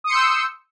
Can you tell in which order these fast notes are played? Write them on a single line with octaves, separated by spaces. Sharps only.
D#6 C#7 C6 G6 E6